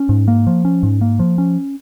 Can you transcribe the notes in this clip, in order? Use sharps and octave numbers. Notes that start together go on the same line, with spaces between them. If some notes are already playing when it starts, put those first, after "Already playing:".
Already playing: C#4
G#2
A#3
F3
C#4
G#2
A#3
F3
C#4